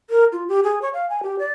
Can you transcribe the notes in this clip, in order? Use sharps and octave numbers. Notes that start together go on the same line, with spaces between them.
A#4
F4
G4
G#4
C#5
F5
G#5
G4
D5